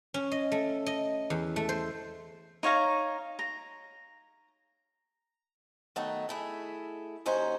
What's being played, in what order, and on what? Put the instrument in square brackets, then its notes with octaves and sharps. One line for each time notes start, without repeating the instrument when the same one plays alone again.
[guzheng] C#4
D#5
A3
D#5
E2
A3
C5
[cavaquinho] D#4 C#5 F5 A#5
A#5
[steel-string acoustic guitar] D#3 F#3 A3 B3 D#4
A3 E4 G#4
D#2 C#4 D#4 F#4 C5